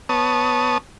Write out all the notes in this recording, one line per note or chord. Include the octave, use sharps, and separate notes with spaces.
B3 C#5 A5 D#6